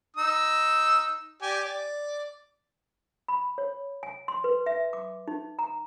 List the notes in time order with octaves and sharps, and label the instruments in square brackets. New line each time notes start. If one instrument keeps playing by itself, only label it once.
[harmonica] D#4 E6
G4 D5 G#5
D5
[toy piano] B5
C#5
G#5
C6
B4
E5
D6
D#4
A#5